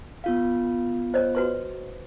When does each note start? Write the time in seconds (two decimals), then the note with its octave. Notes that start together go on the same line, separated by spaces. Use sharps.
0.24 B3 F4 F5
1.14 C5 C#5 D#5
1.35 F#4 B4 C6